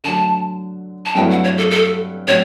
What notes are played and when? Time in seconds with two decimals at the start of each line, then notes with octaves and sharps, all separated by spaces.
0.04 D3 F#3 A3 A5
1.05 A5
1.15 G2 F#3 A3 E4 B4 G5
1.30 F#5
1.44 C#5
1.57 A4
1.71 A4
2.27 A2 F#3 C#5